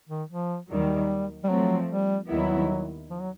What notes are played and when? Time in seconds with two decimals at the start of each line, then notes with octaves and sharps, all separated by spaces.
0.09 D#3
0.29 F3
0.69 D#2 D#3 F#3 G3
1.44 G3
1.49 F3 F#3 A3 C4
1.89 G3
2.29 D#2 D#3 F#3 G3 B3 E4
3.10 F3
3.20 F#3